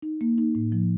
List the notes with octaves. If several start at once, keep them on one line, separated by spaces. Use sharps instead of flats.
D#4
A#3
D#4
A2
F3